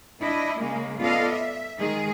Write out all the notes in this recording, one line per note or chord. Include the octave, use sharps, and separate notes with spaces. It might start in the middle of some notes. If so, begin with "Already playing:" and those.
D4 E4 D#5
C#3 G#3 A#3
B3 F4 A4 D5 D#5 F5
E5
D#3 G#3 G#4